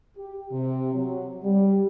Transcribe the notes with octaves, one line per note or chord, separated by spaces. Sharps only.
G4
C3
F#3
G3